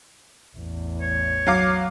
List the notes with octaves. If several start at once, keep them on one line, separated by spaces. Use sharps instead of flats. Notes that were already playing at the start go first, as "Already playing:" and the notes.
A1 E2
C#5
F#3 F5 D6